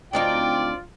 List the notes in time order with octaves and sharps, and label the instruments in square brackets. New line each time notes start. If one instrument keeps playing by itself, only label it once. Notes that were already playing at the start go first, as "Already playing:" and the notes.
[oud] D2 C4 D#4 [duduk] F4 [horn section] D5 [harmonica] G5